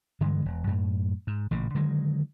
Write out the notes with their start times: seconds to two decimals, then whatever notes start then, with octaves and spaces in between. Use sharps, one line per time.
0.21 G2 D3 E3 G#3
0.46 E1
0.67 F#2 A2
1.27 G#2
1.51 A1 A#2 C#3
1.75 D3 D#3 F#3 G#3